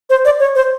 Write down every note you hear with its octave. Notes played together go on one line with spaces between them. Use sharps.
C5
D5
C#5
C5